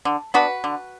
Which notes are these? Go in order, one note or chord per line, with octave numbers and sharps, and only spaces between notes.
D3
B3 D4 F#4 B4
D3